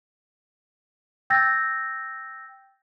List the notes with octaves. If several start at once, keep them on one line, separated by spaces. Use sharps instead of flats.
G5 E6 G6 A6 A#6